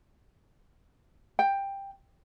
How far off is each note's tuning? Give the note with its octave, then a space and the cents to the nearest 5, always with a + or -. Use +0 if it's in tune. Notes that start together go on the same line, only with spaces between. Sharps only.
G5 +10